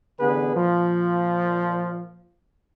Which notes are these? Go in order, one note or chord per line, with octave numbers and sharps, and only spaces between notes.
A1 D3 B3 G#4 B4
A#2 F3